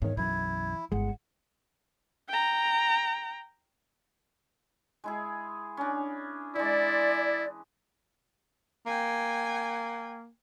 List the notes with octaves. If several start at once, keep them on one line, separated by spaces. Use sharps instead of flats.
E2 G#2 D#3 C#5
B1 F#2 E3 E4 G#6
G1 G#3 E4 F#5
G5 A#5
G#3 E4 G#4
C#4 D4
E3 G#3 E4 D5
A#3 G5 G#5